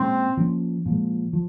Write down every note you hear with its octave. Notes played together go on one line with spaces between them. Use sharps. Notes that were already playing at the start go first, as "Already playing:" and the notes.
Already playing: A#2 G#3 C4 C#4
F3 A#3 C#4
A#2 F3 G#3
F3